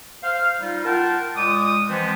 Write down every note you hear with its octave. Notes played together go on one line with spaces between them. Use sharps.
C5 F5
G3 D#4 F4
F4 A#4 F#5 G5 A5
A#2 G#3 D6 D#6
E3 F3 G#3 B3 C4